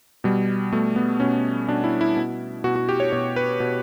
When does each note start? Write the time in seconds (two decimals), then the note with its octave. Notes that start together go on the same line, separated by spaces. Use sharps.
0.24 B2 G3
0.72 B2 A3
0.96 B3
1.20 B2 C#4
1.68 B2 D4
1.84 E4
2.01 E4
2.17 B2
2.64 B2 F#4
2.76 F#4
2.89 G4
3.00 C#5
3.12 B2 C#5
3.36 B4
3.60 B2